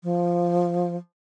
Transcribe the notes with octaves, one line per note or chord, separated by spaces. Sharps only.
F3